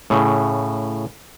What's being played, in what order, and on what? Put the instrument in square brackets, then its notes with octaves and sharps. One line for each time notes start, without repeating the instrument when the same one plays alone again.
[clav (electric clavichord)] A2 C#3